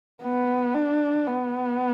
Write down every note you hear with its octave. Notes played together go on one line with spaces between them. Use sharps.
B3
D4
B3